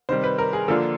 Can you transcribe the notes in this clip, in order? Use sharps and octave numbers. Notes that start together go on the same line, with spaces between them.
C3 D#3 G3 C5
B4
A#4
G#4
D3 F3 A#3 D4 F4 A4